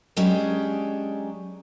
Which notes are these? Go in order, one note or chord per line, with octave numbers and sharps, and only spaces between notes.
F#3 G#3 C#4 D4 G4 G#4